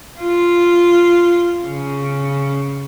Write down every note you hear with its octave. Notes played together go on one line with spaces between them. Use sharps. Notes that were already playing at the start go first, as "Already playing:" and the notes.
F4
C#3